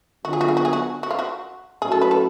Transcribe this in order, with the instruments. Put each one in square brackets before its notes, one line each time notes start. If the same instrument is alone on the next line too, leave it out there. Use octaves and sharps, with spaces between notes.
[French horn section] D3 F#3 B3 F4 [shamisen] F#4
[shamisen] G#4
F#4
G#4
F#4
G#4
F#4
F#4
F4
F#4
[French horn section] A2 F#3 C#4 F#4 [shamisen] G#4
[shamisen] A4
B4
A4